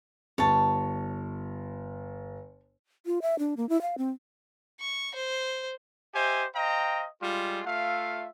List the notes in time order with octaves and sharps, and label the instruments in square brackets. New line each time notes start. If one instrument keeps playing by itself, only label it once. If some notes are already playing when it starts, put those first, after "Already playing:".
[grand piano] G1 [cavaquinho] C#5 A5
[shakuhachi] F4
E5
D4
A#3
E4
F5
C4
[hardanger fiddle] C#6
C5
[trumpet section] G4 C5 D#5 E5 G#5
C5 D#5 F5 G5 A#5
G3 G#3 F4
A3 F4 E5 F5